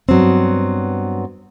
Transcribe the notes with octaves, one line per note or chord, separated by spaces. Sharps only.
G2 F#3 B3 C4